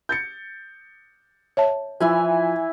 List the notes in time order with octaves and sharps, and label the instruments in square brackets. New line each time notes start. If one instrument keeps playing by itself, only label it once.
[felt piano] G6 A6 C#7
[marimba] C#5 E5 A5
[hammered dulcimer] E3 E4 G#5 [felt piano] F3